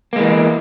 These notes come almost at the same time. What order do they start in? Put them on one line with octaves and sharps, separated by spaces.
A#3 G#3 E3